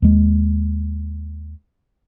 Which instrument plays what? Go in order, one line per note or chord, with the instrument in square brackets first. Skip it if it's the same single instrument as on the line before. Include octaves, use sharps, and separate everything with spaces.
[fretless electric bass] D#2 G#3